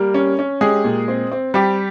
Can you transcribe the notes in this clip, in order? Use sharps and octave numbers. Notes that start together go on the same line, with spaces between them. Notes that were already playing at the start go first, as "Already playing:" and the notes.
Already playing: G3 A#3 A#4
C#4
C#4
G#3 G4 G#4
A#2
C4
C4
G3 C4 G4